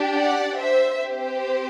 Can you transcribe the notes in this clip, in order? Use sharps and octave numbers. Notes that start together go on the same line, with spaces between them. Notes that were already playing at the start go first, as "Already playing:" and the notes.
Already playing: D4 G4
D5 F#5
C5 E5
C4 G4 C5